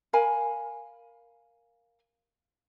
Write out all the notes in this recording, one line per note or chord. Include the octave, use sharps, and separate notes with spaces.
A#4 F5 G#5 B5